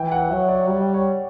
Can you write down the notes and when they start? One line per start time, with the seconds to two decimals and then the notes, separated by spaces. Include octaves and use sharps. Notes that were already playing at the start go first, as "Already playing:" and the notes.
Already playing: E3 G5
0.12 F#5
0.23 F#5
0.30 F#3 E5
0.49 D5
0.68 G3 C#5
0.81 D5
0.94 C#5